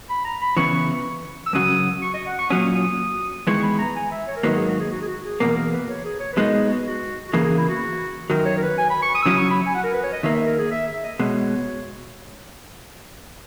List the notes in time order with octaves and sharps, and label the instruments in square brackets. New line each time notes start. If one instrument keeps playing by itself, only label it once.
[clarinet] B5
A#5
B5
[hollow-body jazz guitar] C#3 E3 B3 [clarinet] C#6
[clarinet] E6
[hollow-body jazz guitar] F#2 C#3 F#3 [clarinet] D#6
[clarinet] C#6
D#5
F#5
C#6
[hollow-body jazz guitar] A#2 F#3 C#4 [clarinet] D#6
[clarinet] D#6
[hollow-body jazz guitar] E2 D#3 G#3 B3 E4 [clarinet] C#6
[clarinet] B5
A#5
G#5
E5
C#5
A#4
[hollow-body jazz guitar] G#2 D#3 F#3 A#3 [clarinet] B4
[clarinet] G#4
F#4
G#4
F#4
G#4
F#4
G#4
[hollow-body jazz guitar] E2 B2 A#3 [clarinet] A#4
[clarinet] A#4
B4
C#5
G#4
C#5
B4
[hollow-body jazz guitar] B2 G#3 B3 D#4 [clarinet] A#4
[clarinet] G#4
F#4
F#4
F#4
[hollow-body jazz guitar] E2 C#3 E3 A#3 [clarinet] G#4
[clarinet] G#4
E4
F#4
[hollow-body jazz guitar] F#2 D#3 F#3 [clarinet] A#4
[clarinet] C#5
A#4
B4
G#5
B5
C#6
D#6
E6
[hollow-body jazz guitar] C#3 F#3 C#4 E4 [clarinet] D#6
[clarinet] C#6
B5
G#5
F#5
A#4
B4
C#5
D#5
[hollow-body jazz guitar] D#2 D#3 A#3 [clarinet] E5
[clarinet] E5
A#4
G#4
E5
E5
D#5
[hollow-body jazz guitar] B2 G#3 [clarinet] C#5